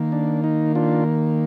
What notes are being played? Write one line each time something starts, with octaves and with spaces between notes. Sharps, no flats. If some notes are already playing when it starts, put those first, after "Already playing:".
Already playing: D#3 A#3
D4
D#4
D4 F4